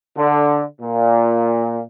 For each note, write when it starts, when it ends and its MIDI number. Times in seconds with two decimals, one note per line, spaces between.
0.16 0.62 50
0.81 1.82 46